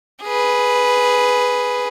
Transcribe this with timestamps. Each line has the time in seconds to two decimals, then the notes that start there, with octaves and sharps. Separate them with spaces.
0.23 G#4 B4